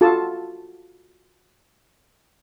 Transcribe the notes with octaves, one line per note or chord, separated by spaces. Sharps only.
F4 F#4 A4 A5